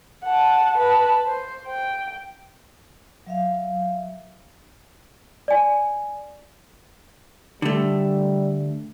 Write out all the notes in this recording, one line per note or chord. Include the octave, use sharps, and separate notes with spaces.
F#5 A5
B4 A5
C5
G5
F#3 E5 F5
D5 G#5
D3 G3 A3